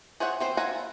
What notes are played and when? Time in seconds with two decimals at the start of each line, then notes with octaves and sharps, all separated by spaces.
0.20 G#4 C5 C#5 E5 F#5
0.40 E3 C4 C5
0.57 E4 F4 F#5 G#5 A#5